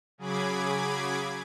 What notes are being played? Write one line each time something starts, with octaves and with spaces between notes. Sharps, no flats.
C#3 F#3 G#4 B5 D6 G#6